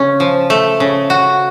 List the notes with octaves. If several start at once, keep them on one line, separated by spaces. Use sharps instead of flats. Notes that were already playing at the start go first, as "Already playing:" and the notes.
Already playing: C#3 C#4
F3
A3
C#3
F#4